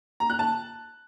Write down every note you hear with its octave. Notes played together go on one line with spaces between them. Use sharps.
A#5
F#6
A5